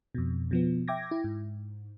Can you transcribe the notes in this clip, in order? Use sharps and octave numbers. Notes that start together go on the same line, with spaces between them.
F2 B2
B2 F3 B3
E5 G5 D6 G#6 A#6
E4
G#2